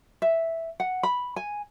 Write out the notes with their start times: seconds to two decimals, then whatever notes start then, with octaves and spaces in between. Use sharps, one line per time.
0.22 E5
0.80 F#5
1.03 B5
1.36 G#5